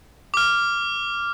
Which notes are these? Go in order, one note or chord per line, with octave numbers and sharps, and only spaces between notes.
D6 F6